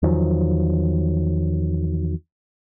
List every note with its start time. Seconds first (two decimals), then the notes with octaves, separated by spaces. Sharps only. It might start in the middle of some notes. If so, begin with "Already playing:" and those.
0.03 E2 D#3 F3 F#3